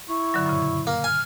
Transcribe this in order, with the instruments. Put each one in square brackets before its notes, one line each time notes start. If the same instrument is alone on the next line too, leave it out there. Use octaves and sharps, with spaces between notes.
[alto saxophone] E4 [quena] C#6
[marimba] G2 D3 F#3
F#2 A#2 C#3
[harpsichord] A#3
[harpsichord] G#5 [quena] F6